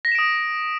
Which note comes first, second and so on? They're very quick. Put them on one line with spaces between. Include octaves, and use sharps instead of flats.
A#6 B6 E7 D7 D#6